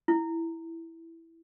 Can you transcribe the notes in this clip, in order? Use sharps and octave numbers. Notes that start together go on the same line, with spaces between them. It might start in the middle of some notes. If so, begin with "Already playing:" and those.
E4